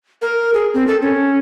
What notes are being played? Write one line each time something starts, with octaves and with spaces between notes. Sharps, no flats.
A#4
G#4
C4
A4
C#4